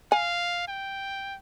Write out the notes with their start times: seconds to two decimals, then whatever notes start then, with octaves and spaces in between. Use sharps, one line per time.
0.12 F5 G#5
0.68 G5